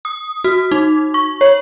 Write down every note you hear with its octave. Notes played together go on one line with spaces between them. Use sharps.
D#6
F#4
D#4
C#6
C#5